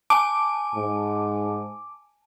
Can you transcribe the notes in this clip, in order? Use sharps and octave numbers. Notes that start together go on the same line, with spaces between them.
G#5 A5 D6
G#2